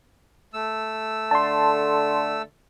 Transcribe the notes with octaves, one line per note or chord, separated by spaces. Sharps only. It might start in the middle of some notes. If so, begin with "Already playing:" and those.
A3 E6
D3 A5 C6